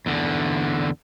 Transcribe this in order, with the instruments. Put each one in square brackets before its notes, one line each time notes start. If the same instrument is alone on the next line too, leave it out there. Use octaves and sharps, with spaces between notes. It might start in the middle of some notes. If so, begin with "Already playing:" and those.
[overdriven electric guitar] E2 D3